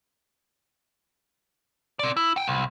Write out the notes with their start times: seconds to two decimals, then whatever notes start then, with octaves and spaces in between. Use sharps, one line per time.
1.99 C4 D5
2.17 E4
2.36 F#5 G5
2.48 C2